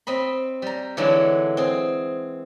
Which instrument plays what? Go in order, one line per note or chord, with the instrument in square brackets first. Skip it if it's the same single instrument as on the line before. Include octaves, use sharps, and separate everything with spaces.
[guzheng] C4 D#5 B5
G3 A#5
D3 E3 F#3 G#3 E4 A4
C4 G#4